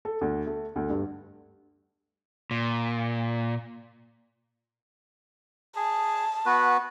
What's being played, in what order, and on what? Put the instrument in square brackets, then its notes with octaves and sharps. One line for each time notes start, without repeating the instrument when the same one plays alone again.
[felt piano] A4
D2
A3
D2
G2
[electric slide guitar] A#2
[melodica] G#4 [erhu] A5
[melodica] B3 F#4 B4